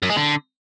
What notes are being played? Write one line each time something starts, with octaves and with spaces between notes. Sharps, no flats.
F#2
G#3
D3